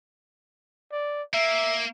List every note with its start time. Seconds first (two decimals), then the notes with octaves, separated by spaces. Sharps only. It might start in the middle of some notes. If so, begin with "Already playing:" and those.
0.92 D5
1.34 A#3 E5